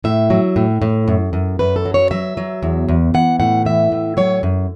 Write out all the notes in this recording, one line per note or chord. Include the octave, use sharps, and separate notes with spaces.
A2 E5
F#3
A2
A2
F#2
F#2
F#2 B4
A4
F#3
C#5
F#3 E5
F#3
E2
E2
E3 F#5
A2 F#5
E3 E5
A2
F#3 C#5
F#2